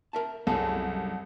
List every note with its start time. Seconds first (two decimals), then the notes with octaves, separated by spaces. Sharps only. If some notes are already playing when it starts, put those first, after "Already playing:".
0.13 A#4 E5 A5
0.47 C2 F#2 G#4 A4